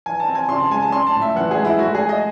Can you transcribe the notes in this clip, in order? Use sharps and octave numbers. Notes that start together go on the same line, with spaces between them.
E3 G#5
A5
C4
G#5
C#3 C6
A5
G#3 G#5
A5
C#4 C6
A5
A2
E5
E3 F#5
G#4
G#3
E4
A3 F#4
G#4
A3
D#5